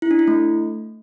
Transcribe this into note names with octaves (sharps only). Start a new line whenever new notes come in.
E4
D4
E4
A3